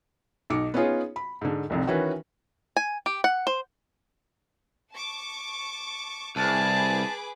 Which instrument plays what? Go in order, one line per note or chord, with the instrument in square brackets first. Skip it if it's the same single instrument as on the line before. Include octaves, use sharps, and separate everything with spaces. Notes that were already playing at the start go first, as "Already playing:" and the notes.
[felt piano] B1 D#4 D6 C#7
B3 C#4 D#4 F4 G#4 C#5
B5
G#2 D3
F1 C2 F2
D#3 E3 C#4 F#4 B4
[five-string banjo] G#5
G4
F#5
C5
[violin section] A5 C#6 D6
[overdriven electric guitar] C2 [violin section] G#4 B4 D6 [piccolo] A5